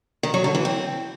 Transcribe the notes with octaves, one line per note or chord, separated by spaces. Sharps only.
D#3
F#3
D3
E3
C4